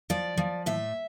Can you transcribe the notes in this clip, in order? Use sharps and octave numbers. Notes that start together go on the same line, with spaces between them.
F3 D5
F3
A2 E5